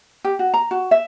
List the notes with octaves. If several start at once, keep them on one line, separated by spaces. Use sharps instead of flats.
G4
F#4
A#5
F#4
E5